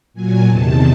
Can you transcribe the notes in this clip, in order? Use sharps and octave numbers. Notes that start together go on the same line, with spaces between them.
A#2 F#3 G#5
E2 C3 D#3 A5